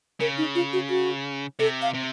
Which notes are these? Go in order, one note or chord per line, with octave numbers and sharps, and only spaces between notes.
C#3 A#4
D#4
F4
F#4
F#4
C3 A4
F5
C3